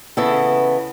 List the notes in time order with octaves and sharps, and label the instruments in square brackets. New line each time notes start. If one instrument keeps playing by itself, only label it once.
[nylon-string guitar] C#3 E3 B3 E4 A4